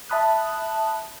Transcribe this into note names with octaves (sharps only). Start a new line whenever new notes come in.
E5 A5 B5 D#6 F#6